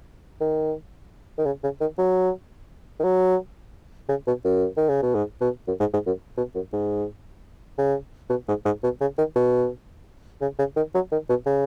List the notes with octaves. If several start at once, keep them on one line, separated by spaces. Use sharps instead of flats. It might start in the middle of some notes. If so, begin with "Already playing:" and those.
D#3
D#3
C#3
C#3
D#3
F#3
D#3
F#3
C#3
B2
F#2
D#3
C#3
B2
G#2
B2
F#2
G#2
G#2
F#2
B2
F#2
G#2
C#3
B2
G#2
G#2
B2
C#3
D#3
B2
C#3
C#3
D#3
F#3
D#3
B2
C#3